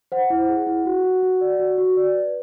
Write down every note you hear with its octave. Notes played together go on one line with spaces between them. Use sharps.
C5 F#5
E4
G#4
E4
F#4
F#4
F#4
D5
F#4
F#4
D5
B4